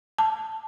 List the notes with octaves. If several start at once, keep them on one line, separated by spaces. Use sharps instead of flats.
A5